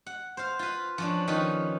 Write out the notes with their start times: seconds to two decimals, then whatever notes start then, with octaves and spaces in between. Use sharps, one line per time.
0.06 F#5
0.37 C5 F5
0.59 F4 B4
0.98 F3 C#4 D4
1.28 D#3 F3 C#4 B4